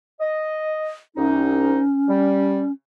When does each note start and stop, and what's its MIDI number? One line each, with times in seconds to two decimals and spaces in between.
0.20 0.93 75
1.16 1.80 36
1.16 2.72 61
1.16 1.80 63
2.08 2.62 55